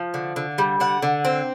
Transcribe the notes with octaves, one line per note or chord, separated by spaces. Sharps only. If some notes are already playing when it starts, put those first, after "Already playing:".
Already playing: F3 F5
D3
D3
G3
D3 F#5
D3
C4